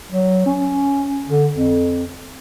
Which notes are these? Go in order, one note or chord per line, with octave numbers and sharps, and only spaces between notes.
F#3
C#4
D3
F2